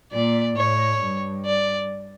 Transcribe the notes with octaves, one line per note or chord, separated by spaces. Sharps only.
A#2 D5
A2 C#5
G2
D5